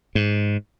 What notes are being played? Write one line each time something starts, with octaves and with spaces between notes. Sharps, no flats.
G#2